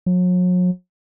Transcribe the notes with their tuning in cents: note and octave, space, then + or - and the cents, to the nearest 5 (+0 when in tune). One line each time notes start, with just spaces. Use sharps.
F#3 -40